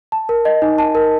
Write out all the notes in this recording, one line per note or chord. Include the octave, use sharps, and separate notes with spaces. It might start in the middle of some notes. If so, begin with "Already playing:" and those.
A5
A#4
D#5
D#4
A5
A#4